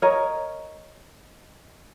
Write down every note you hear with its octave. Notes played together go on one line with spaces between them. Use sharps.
A#4 C#5 D#5 A#5